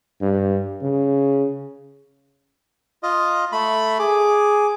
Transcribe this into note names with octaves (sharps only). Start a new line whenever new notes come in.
G2
C#3
F4 D#5
A3 B5
G#4 D6